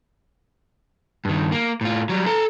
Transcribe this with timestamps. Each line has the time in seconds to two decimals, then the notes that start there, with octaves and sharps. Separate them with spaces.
1.25 G2 D#3
1.52 A#3
1.81 A2 F4
2.09 F#3 G3
2.27 A4 A#5